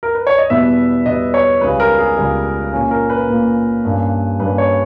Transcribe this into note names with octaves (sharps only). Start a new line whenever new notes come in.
A#4
B4
C#5
D#5
E2 B2 G3 B3 E5
E2 B2 G3 B3 D#5
C#5
C#2 C#3 G3 B4
A#4
G#4
C#2 C#3 G3 G#4
A#2 A#3 C#4
A#4
B4
A#2 A#3 C#4
G2 G3 A#3 C#4
G2 G3 A#3 C#4 B4
C#5